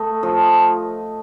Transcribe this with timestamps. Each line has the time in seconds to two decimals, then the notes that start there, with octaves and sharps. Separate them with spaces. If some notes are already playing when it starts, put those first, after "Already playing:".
Already playing: A3 D#5
0.23 F3